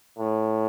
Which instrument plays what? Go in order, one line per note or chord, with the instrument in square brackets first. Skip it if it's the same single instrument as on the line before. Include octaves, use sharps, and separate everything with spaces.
[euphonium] A2